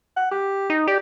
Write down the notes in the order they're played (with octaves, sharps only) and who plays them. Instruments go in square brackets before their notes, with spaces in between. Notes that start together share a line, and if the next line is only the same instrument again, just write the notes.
[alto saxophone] F#5
G4
[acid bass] D#4
[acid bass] G4 [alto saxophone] D5